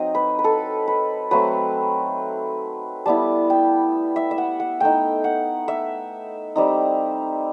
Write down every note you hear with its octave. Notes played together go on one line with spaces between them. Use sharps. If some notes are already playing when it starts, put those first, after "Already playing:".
Already playing: F#3 C4 D#4 D#5
B4
B4
A4
B4
F#3 A3 C4 B4
G3 B3 E4 A5
G5
E5
E5
F#5
F#5
A3 D#4 G5
F#5
E5
G3 C4 D#4